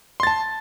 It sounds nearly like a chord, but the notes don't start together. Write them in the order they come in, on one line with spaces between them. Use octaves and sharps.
C6 A6 A5